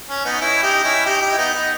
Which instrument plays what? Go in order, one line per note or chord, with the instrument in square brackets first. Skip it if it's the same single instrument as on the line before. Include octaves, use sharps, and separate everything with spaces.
[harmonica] C#4
B3 D#4
C#4 E4
D#4 G4
C#4 E4
D#4 G4
D#4 G4
E4
B3 D#4
B3 D#4